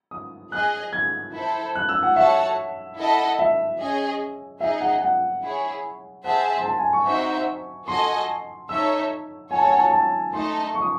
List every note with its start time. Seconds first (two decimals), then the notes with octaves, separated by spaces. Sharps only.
0.11 D#6
0.52 G#4 D#5 G#5 F#6
0.93 G#6
1.34 E4 A4 C5
1.75 F#6
1.89 E6
2.03 F#5
2.16 F#4 A4 C#5 E5 F#5 A5
2.98 E4 A4 D#5 F#5 A5
3.39 E5
3.79 C#4 G#4 D#5 G#5
4.60 D#4 G#4 D#5 E5
4.81 F#5
5.02 F#5
5.43 E4 G#4 C#5
6.24 G#4 C5 E5 F#5 A5
6.58 C6
6.65 A5
6.78 G#5
6.93 C#6
7.06 C4 D#4 F#4 C5 E5
7.88 F#4 A4 D#5 G#5 C6
8.69 D#4 A4 C#5 E5 E6
9.51 F#4 A4 C#5 G#5
9.58 A5
9.65 G#5
9.79 A5
9.93 A5
10.33 A3 D#4 A4 D#5 A5 C6
10.74 C#6
10.82 D#6